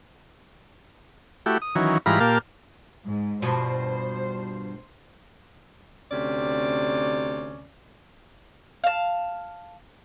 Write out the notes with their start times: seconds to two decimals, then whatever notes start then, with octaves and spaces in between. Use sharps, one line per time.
1.46 A3 E4 F#4 G4
1.62 D#6
1.75 D#3 E3 F#3 C#4
2.06 G#2 E3 G3 F4 A#5 B5
2.20 A#2 A#3 G4 F5 A5
3.06 G#2
3.42 G2 B2 F3 C5
6.11 D2 C3 C#4 D5
8.84 F5 A5